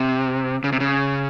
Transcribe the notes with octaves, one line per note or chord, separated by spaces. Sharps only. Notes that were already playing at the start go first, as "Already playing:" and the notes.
Already playing: C3
C#3
C3
C#3